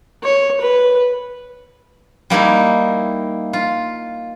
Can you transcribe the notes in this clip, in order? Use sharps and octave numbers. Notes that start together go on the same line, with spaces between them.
C#5
B4
G3 A#3 D#4 E4 A#4
F4